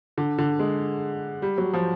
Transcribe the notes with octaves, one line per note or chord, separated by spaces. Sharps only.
D3
D3
G#3
G3
F#3
F3